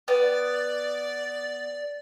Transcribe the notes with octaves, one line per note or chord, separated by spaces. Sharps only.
B3 D5